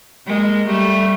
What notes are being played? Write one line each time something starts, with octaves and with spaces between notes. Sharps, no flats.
G#3 A#3
G3 A3